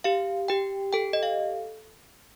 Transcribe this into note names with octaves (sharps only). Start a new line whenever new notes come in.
G4 F5
G4 G5
A4 G5
D#5
F5